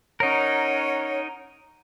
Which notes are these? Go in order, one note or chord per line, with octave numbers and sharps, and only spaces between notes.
C#4 D#4 A#4 C#5 F#5